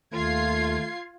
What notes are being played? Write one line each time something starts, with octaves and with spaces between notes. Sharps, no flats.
D#2 A3 F4 G#6 C7